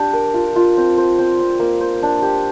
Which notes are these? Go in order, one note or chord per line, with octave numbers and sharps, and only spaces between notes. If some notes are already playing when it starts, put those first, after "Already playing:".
Already playing: D4 G4 D5
A#4
F4
F4
C4
C5
C4
C4
A#3
C5
D4
G4